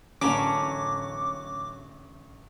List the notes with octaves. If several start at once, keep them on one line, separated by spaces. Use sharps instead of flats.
A1 D3 F#3 A#3 C#4 A4 D6 D7